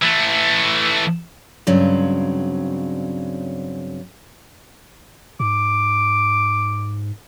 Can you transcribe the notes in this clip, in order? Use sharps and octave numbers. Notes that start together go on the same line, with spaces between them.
E3 A3
G2 C#3 F#3 C4
G#2 D6